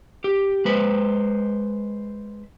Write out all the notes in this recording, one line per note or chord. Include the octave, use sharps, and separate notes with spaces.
G4
G#3 B4 C5